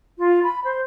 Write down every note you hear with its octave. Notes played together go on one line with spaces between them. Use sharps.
F4
B5
C5